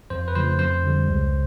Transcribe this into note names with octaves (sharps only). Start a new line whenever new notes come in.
F2 C5
B4
C#3 F3 A3 C5
F2 C5
D3 G3
C#2